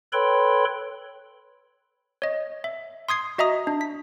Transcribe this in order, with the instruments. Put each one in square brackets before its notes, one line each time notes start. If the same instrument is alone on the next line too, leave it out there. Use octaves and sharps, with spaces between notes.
[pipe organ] A4 B4 C#5 G5 B5 C6
[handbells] C#5 D#5
E5
C6 D#6 G#6 C7
F#4 D#5 E5 A#5 D#6
D4
B6